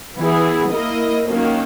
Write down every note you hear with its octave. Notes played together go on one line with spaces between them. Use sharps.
E3 B3 E4 G#4
A#3 E4 A#4 D#5
D#3 F#3 A#3 C#4